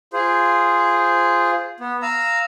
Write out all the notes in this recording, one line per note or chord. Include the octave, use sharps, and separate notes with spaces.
F4 G#4 C5
B3
F5 A#5 E6